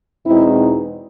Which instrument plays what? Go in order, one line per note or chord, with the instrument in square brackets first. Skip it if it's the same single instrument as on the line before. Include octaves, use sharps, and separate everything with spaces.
[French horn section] E2 B2 G#3 C4 D#4 E4